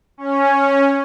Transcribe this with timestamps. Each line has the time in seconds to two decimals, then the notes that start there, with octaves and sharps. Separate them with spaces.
0.18 C#4